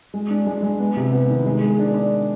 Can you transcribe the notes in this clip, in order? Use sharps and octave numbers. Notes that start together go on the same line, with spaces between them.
G#3
D4
G#3
G#3
B3
C3
B3
D#3
G#3
G#4
D4
D5